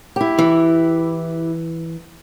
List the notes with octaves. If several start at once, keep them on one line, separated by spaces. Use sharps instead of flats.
E4 G4
E3